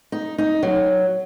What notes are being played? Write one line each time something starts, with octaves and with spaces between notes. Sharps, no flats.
D#4
D#4
F#3